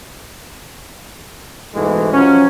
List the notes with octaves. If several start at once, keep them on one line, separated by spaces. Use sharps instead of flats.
G#2 B2 E3 G#3 A3
F3 F#3 C#4